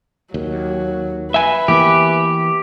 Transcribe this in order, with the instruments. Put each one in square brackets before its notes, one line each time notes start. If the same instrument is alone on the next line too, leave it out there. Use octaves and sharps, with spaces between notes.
[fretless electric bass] D#2 [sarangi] F#3
[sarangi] B4 [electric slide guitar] E5 G#5
[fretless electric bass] E3 A#3 B3 [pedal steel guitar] G4